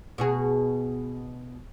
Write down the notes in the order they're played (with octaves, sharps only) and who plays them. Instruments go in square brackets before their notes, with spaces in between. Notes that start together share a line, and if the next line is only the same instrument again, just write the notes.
[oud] B2 F#4 G#4